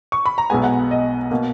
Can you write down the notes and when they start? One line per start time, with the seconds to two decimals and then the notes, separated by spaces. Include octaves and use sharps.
0.12 C#6
0.26 B5
0.38 A#5
0.50 B1 B2 G#3 B3 G#5
0.64 F#5
0.91 D#5
1.31 B2 A#3